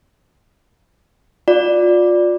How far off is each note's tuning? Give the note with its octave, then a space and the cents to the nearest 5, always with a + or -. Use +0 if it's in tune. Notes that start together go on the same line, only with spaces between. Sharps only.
F4 +30 D5 +0